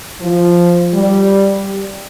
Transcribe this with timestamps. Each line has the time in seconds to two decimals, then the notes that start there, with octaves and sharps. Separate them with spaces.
0.21 F3
0.94 G3